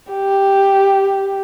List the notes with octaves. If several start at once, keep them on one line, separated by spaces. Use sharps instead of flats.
G4